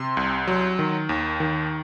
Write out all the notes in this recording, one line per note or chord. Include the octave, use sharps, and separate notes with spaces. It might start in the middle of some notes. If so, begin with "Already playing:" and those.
Already playing: C3 C6
C2
F#3
D#3
D#2
D#3